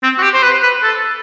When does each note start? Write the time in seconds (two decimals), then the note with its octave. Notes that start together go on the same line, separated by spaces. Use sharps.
0.03 C4
0.18 F#4
0.23 G4
0.34 C5
0.43 B4
0.63 B4
0.83 A4